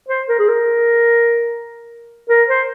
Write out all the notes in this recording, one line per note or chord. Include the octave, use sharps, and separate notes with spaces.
C5
A#4
G#4
A#4
A#4
C5